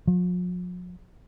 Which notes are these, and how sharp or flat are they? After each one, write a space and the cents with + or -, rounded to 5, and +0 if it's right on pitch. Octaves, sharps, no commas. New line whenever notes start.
F3 +45